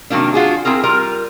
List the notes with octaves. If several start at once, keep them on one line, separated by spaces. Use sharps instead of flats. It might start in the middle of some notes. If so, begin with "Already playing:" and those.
C3 D#3 F#3 A#3 D4
D4 F4 F#4 G#4
C4 E4 G#4 A#4
G3 F4 A#4 A#5